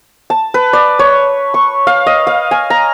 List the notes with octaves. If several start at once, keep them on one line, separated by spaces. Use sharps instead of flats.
A5
B4
D5
C#5
C#6
F5
D#5
F5
G#5
A#5